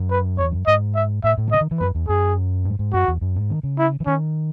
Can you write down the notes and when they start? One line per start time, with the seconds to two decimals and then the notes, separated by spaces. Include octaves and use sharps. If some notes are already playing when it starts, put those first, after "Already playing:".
Already playing: F#2
0.11 B4
0.38 E2 C#5
0.52 F#2
0.67 G#2 D#5
0.95 E5
1.24 A2 E5
1.38 A2
1.47 D#3
1.52 C#3 D#5
1.61 D#3
1.71 E3
1.79 F#2 B4
1.95 E2
2.08 F#2 G#4
2.65 G#2
2.79 G#2
2.93 F#2 F#4
3.08 E2
3.21 F#2
3.36 G#2
3.50 D#3
3.63 C#3
3.79 E4
4.00 E3
4.06 D#3 C#4